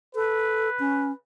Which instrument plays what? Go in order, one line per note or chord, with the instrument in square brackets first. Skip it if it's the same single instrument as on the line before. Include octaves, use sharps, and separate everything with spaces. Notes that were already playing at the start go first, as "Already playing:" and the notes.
[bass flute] A4 [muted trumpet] B4
[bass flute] C#4